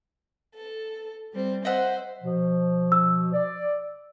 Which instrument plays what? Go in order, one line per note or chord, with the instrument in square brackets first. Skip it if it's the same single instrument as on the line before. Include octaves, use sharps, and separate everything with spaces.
[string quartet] A4
G3 C4
[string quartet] C5 [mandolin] D#5 E5 F#5
[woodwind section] B2 F3
[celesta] E6
[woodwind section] D5